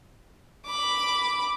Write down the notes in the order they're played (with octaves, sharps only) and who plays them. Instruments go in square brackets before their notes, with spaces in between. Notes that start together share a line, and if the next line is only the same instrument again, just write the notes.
[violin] B5 D6